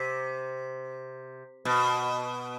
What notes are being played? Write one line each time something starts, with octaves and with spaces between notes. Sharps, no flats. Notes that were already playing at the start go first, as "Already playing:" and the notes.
Already playing: C3
B2